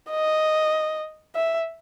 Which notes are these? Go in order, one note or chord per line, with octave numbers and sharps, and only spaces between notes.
D#5
E5